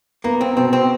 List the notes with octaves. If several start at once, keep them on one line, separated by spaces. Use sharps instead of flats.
A#3 B3
C4
B2 C4
C4